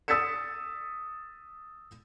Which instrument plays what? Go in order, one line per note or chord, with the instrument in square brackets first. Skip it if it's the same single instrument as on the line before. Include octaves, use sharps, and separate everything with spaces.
[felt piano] D#6 E6 A6 B6 C#7 E7